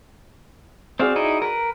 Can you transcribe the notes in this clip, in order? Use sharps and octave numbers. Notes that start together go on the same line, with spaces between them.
C4 F#4 G#4 C5 D5 F5
D#4 E4 D#5
A#4 B4